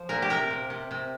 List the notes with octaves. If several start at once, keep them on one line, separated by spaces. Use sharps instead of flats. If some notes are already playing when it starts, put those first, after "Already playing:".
Already playing: F3 C5
A#2 A#4
G4
C3 A#4
C3
C3
C3